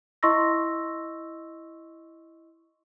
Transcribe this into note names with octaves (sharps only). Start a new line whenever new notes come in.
E4 D#5 C6 C#6 E6 A#6